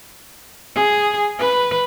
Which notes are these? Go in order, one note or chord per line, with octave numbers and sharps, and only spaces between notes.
G#4
B4